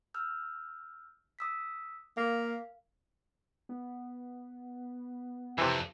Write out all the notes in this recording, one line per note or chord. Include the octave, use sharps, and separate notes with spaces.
E6 F6 G6
D#6 E6 B6
A#3 A#4 F5
B3
F2 C3 E3